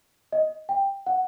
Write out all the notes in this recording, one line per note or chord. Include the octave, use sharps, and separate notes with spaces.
D#5
G5
F#5